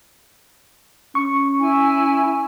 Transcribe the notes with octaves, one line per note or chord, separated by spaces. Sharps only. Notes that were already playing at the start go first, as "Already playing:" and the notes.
C#4 C#6
E4 G#5